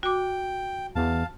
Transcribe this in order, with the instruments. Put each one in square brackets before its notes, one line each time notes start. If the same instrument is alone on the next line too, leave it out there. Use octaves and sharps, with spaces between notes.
[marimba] F#4 D6 [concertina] G5
[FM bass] E2 [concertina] F5 A5